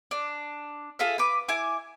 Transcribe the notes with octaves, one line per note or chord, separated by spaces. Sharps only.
D4
F4 G#4 A4 E5
B4 D6
E4 G#5 D6